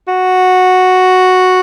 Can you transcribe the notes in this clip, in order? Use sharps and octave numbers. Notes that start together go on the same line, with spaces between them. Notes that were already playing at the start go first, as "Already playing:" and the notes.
F#4